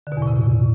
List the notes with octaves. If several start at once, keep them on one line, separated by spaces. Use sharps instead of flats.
D3
B2
E2
A2
C3